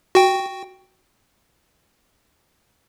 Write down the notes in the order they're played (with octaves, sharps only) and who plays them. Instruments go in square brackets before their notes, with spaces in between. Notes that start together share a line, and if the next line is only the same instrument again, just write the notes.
[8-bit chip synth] F#4 G5